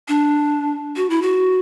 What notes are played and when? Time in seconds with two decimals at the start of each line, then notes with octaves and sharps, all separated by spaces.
0.08 D4
0.97 F#4
1.10 E4
1.22 F#4